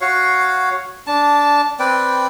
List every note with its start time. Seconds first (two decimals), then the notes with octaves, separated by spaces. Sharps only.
0.01 F#4 C#5 F5
1.07 D4 A5
1.80 C4 B4 D5 G5